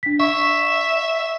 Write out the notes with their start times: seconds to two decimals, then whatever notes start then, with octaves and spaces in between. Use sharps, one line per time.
0.03 D4 B6
0.20 E5 C#6